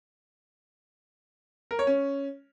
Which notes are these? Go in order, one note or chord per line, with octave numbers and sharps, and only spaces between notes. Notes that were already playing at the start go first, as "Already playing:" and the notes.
A#4
C#5
C#4